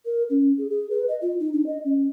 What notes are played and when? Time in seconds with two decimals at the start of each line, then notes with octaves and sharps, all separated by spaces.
0.05 A#4
0.30 C#4
0.58 G#4
0.70 G#4
0.90 B4
1.08 D#5
1.22 F4
1.40 D#4
1.53 D4
1.66 D#5
1.85 C#4